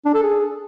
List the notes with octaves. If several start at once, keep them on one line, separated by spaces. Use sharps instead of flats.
D4
A4
G#4